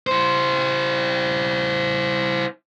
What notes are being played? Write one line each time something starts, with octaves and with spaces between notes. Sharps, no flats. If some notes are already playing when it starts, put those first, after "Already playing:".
E4 C5